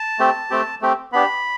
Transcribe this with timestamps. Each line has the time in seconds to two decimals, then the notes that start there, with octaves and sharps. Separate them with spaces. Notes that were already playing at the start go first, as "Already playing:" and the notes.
Already playing: A5
0.19 A3 C4 G4
0.50 A3 C4 G4
0.82 A3 C4 G4
1.12 B3 D4 G4 B5